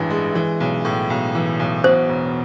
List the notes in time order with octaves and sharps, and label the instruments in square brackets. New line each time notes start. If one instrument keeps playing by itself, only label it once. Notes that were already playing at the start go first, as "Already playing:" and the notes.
Already playing: [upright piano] A1 G2 E3 G#3
G#3
E3
B1
A2
B1
E3
B1
[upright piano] B2 [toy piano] C5
[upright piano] E1